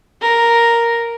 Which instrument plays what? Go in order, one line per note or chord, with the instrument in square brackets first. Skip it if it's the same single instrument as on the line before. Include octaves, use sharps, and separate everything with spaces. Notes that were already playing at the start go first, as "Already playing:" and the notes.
[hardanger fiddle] A#4